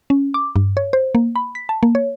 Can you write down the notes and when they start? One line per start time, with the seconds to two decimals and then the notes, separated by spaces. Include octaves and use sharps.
0.10 C#4
0.34 D6
0.56 G2
0.77 C#5
0.93 C5
1.15 A#3
1.36 B5
1.55 B6
1.69 A5
1.83 A#3
1.95 C#5